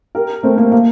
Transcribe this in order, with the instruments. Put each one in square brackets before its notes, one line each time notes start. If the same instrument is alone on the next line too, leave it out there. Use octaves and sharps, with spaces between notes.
[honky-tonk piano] G4 A#4
A3 C4
A#3
A#3